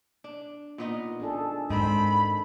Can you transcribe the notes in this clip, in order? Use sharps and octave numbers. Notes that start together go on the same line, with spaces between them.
D4
A#2 B3 D#4
D4 G#4 A4
G#2 D#3 C4 B5